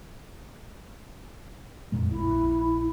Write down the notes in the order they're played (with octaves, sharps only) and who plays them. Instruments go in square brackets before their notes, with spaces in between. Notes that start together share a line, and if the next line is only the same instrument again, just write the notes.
[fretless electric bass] F2 A#2 G#3
[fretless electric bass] A#1 [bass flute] E4